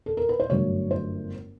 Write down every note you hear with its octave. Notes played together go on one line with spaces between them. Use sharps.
A4
A#4
B4
C5
G1 F#2 D3 F#3 A3 C#5
C5